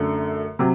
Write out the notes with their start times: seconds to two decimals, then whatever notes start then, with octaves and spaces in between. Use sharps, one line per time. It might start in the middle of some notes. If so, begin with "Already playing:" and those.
Already playing: F#2 D3 A3
0.59 C3 F#3